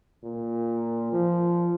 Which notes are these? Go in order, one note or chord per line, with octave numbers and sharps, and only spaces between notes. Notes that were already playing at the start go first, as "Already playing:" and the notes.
A#2
F3